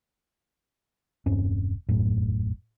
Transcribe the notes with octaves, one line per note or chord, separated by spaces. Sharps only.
E1 G2 C4 C#4
E1 A1 F#2 A2